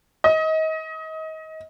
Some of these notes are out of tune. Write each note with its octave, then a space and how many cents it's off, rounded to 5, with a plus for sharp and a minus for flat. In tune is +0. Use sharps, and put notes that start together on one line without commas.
D#5 +30